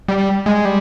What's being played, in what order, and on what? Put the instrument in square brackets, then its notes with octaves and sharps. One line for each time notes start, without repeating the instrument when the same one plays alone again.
[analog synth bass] G3
G#3
G3